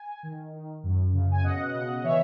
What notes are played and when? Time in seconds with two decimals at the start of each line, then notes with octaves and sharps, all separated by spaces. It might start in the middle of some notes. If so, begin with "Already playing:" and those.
Already playing: G#5
0.23 D#3
0.53 D#3
0.83 F#2
1.13 C#3
1.32 G#5
1.43 B2 D#5 F#5
1.74 B2
2.04 E3 C#5 E5